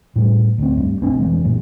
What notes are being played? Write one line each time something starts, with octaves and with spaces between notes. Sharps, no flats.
A2 G3
D2 C4
G2
F#1 B1 C4 D4
F1 E3 G#3
F#2 A#2 F#3